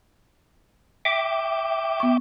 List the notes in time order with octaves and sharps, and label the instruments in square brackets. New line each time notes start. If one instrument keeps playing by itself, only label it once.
[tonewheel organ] E5 G5 D6
[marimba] B3 C#6